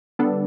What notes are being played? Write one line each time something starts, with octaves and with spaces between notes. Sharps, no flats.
D3 G3 B3 D4 A4